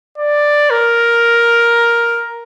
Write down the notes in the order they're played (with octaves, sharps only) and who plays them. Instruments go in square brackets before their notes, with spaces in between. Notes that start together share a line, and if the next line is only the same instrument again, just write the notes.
[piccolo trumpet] D5
A#4